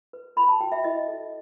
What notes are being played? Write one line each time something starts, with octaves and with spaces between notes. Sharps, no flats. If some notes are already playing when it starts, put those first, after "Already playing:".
B4
B4 B5
A5
F#4 G5
E5
E4 D#5
A4